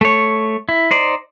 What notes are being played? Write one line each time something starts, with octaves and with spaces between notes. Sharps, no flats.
A3 C#5
E4
D#4 C5 D5